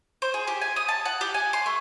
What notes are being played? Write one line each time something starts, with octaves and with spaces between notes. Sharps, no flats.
C5
G#4
G4
G#5
D#6
A5
F#5
G4
G#5
C6
A3